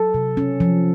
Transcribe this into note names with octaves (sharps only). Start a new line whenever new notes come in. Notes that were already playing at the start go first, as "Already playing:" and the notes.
Already playing: F#3 A4
C3
C#4
F3